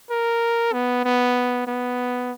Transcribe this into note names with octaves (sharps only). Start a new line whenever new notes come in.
A#4
B3
B3
B3